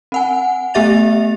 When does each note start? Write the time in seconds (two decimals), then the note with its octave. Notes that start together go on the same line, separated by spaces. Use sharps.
0.12 C4 F#5 G#5
0.74 A3 B3 G4 E5 A6 F7